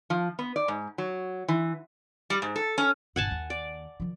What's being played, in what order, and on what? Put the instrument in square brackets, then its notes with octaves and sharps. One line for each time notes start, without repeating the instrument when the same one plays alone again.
[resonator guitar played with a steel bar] F3
B3
D5
G#2
F#3
E3
G3
G#2
A4
C#4
[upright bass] G1 A#2 [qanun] F#5 G#5 A5
[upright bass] D#2
[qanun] D5
[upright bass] D#3 F3